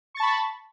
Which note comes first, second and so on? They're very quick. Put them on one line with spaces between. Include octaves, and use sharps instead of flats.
C#6 A6 A5 B5